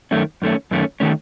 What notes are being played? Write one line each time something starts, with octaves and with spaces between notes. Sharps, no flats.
F#2 D#3 A3 C#4
F#2 D#3 A3 C#4
F#2 D#3 A3 C#4
D#3 A3 C#4